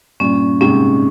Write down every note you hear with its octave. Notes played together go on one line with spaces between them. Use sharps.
G2 A#2 C#4
G#2 C3 C#4